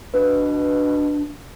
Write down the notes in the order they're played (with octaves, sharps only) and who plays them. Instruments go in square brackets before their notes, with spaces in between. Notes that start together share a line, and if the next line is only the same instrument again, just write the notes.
[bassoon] B2 [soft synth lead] D4 [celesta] B4